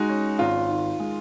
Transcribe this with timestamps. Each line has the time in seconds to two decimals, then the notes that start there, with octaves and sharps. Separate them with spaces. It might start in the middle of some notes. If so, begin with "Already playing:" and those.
Already playing: G#3 D#4 F#4
0.09 C#4
0.39 G#1 F4
0.69 D#3
1.00 G#3